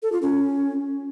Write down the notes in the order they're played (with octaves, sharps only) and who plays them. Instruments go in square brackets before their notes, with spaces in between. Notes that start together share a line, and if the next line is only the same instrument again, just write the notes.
[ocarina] A4
F4
C#4